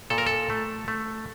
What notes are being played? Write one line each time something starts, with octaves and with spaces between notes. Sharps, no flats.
A#2 A4
A#4
A4
A3
A3